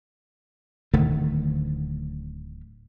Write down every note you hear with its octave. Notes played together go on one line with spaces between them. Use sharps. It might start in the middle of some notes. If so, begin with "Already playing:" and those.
D1 D3 D#3 A3